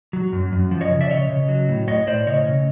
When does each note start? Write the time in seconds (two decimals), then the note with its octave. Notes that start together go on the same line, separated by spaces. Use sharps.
0.13 F#3
0.33 F#2
0.52 F#2
0.71 F3
0.81 C#5 D#5
0.90 C#3
1.01 D5 E5
1.10 C#3 C#5 D#5
1.29 C#3
1.48 F#3
1.69 A2
1.88 A2 C#5 D#5
2.07 A2 C5 D5
2.27 C#3 C#5 D#5
2.46 C#3